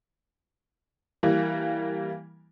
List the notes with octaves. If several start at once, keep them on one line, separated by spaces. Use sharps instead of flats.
E3 G3 A#3